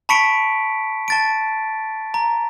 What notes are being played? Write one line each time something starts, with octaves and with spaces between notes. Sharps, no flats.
A5 B5 C#6 B6 C#7 D7
A5 A6 D7
A#5